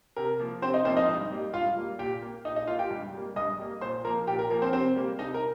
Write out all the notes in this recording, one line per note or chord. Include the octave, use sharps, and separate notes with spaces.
C3 A#4
F3 A#3
C3 C4 C5
D#4 D#5
F3 A#3 C4 C5
D#4 D#5
G2
G3 A#3
G2 F4 F5
G3 A#3
A#2 G4 G5
A#3
A#2 D#4 D#5
D#4 D#5
A#3 F4 F5
G4 G5
G2
G3 A#3
G2 D#5 D#6
G3 A#3
A#2 C5 C6
F3 A#3 A#4 A#5
A#2 G4 G5
A#4
F3 A#3 A#4
C4 C5
C3 C4 C5
G3 A#3
C3 D#4 D#5
A#4